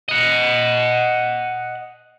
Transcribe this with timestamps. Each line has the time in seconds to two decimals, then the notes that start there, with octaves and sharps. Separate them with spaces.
0.09 D#5 F#5